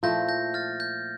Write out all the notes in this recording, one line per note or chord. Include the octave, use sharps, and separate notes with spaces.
A#2 F3 A3 E4 G6 A#6
G6 A#6
F6 A6
G6